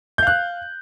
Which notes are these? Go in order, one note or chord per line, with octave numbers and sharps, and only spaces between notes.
F5 F#6 G6